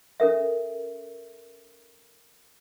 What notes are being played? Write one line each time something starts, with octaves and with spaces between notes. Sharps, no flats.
C#4 A4 A#4 E5